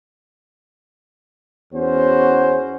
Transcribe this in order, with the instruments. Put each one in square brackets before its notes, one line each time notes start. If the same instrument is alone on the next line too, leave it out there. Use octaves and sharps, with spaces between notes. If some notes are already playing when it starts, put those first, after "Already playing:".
[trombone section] E2 B3 C#4 F#4 C5